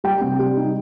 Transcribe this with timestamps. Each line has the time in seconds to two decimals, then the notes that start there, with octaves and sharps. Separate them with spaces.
0.04 G3 G5
0.21 C3
0.39 G3
0.57 D#4